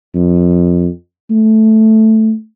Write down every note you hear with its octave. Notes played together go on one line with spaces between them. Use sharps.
F2
A3